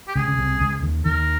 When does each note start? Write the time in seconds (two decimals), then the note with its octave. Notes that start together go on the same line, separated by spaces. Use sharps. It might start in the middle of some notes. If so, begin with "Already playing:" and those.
0.07 G4
0.15 C#2 C#3 G#4
0.28 C#3
0.38 C2 C3
0.60 C#2 C#3
0.83 D#2 D#3
1.05 D#2 D#3 A#4